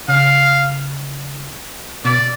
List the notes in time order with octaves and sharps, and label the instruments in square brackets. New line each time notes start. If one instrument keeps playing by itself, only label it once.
[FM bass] C#3 [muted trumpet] F5
[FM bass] B2 [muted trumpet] D5